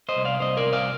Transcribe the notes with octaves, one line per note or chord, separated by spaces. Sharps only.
C5 D#5
C2
D5 F5
C2 C5 D#5
A#4 D5
C2
D5 F5